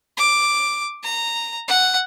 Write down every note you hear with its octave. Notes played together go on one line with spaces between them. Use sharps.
D6
A#5
F#5